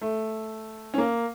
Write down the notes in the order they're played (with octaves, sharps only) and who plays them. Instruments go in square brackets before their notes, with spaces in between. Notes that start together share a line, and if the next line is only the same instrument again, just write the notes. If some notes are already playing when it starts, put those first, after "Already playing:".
[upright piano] A3
C#4
A#3